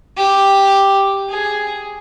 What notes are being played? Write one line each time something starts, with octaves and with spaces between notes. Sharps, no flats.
G4
G#4